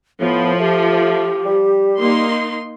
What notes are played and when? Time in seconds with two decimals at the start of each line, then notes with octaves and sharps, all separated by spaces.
0.20 A2 F3 B3
0.60 A3 G4
1.46 G3
1.98 A#3 D#4 C6